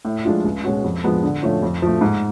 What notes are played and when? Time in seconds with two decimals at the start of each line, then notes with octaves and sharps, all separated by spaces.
0.05 A2
0.25 F3 G#3 D4 F4
0.44 C#2
0.64 B2 G#3 C#4 F#4
0.84 F2
1.04 F3 G#3 B3
1.23 D3
1.43 F3 A3 C#4 F4
1.63 F2
1.82 F3 A3
2.01 G#2